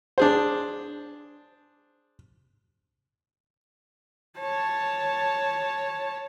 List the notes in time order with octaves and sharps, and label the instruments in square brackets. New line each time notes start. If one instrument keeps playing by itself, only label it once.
[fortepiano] D4 G#4 C5
[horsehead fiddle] C#5 A5